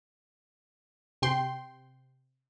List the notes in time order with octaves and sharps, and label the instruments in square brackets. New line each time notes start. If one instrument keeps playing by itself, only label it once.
[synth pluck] C3 G5 C6